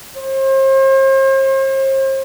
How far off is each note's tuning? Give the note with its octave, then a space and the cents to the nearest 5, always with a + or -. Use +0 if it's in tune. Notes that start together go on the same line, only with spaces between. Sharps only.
C5 +40